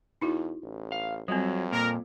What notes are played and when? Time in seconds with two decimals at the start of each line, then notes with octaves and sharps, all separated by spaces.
0.21 E2 D#4 E4 F#4
0.63 A1
0.92 F5
1.28 F2 F#3 G3 C4
1.72 A#2 A#4